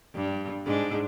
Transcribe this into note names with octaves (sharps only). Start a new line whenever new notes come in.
G2
G#2 D4